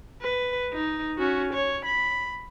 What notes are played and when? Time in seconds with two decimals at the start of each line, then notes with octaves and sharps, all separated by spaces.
0.22 B4
0.73 D#4
1.18 C#4 F#4
1.53 C#5
1.85 B5